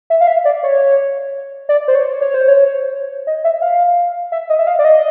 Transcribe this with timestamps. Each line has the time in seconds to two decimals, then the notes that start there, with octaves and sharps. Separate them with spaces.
0.10 E5
0.21 F5
0.27 E5
0.45 D5
0.63 C#5
1.69 D5
1.88 C5
1.95 C#5
2.21 C#5
2.34 C5
2.48 C#5
3.27 D#5
3.44 E5
3.62 F5
4.32 E5
4.49 D#5
4.59 E5
4.67 F5
4.79 D5
4.85 D#5